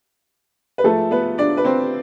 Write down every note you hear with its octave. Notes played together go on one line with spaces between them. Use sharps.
B4
G#2 F3 G#3 A3 A4
B3 B4
D4 D5
B4
C4 C5